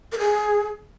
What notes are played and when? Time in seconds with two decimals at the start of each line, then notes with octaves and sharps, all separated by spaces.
0.12 A#4
0.19 G#4